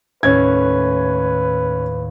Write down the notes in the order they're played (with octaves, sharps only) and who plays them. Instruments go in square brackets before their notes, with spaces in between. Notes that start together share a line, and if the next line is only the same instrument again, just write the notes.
[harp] D#2 A2 [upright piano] C#4 G#6 [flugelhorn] B4